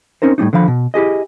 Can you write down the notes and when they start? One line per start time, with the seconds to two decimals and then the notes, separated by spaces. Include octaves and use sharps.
0.22 C4 C#4 D#4 A#4 C5
0.38 A2 G3 D4 D#4
0.53 D3 D#3 F3 F5 B5
0.68 B2
0.94 E4 G4 G#4 D#5